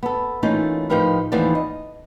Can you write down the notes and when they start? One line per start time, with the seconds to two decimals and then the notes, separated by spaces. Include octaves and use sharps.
0.03 B3 A4
0.43 E3 A3 A#3 C#4 D#4 F4
0.90 A2 F3 D#4 G4 A#4 B4
1.32 D#2 E3 F3 A3 B3 D5
1.55 D#5